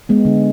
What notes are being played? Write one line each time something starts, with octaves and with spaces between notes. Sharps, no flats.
G#3 B3
D3